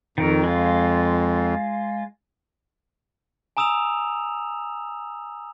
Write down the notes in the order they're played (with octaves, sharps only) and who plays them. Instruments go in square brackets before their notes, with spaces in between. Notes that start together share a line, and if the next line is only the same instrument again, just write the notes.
[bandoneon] F2 [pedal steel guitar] D#3 A#4
[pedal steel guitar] G#3 F4
[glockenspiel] G#5 A#5 D#6 E6 E7 F7